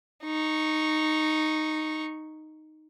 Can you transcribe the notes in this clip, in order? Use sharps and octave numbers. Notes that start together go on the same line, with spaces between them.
D#4 C#6